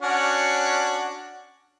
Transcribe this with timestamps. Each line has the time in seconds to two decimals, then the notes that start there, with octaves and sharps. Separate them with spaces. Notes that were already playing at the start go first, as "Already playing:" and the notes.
0.02 C#4 D4 F#4